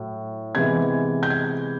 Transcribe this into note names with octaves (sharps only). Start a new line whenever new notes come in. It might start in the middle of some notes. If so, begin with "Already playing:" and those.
Already playing: A2 F#3
C3 E3 G#3 B3 G#6
G6
G#6